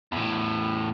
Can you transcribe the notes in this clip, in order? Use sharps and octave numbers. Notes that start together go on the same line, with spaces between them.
E2 A2